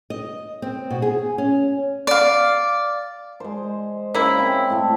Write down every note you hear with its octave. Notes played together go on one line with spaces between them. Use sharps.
D#5
C4
B2
G#4
C#4
D5 F5
G#3 C5
C#3 A#3 E4
C4
A2 A3